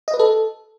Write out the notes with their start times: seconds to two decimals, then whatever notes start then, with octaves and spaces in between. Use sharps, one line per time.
0.08 D#5
0.14 B4
0.19 A4